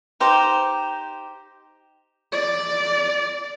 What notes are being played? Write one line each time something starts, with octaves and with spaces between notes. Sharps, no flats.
D#4 G4 C5
D5